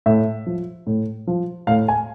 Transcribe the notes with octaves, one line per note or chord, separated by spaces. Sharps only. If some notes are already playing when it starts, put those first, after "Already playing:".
A2 E5
F3
A2
F3
A2 F5
G#5